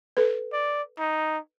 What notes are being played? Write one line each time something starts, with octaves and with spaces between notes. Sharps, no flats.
A4 B4
D5
D#4